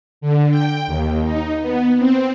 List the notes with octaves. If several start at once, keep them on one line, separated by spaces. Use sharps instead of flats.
D3
G5
D#2
D#4
B3
C4